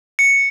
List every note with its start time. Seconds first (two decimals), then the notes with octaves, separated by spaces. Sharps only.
0.19 C#7